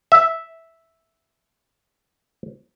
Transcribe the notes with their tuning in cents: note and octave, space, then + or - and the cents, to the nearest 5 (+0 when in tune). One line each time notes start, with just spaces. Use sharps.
E5 -5